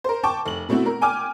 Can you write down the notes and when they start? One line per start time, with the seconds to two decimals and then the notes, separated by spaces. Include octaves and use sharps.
0.04 A#4 C5
0.23 G5 A5 C#6 D6
0.46 F1 F#7
0.69 B2 A3 C4 E4 F#4
0.86 A#4
1.01 G5 G#5 D6 F6